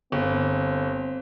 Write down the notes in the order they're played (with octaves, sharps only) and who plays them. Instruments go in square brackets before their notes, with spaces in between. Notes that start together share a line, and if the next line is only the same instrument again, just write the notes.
[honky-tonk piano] G1 [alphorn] C4